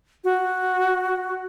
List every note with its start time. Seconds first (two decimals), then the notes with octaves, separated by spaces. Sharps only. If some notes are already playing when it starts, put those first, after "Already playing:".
0.24 F#4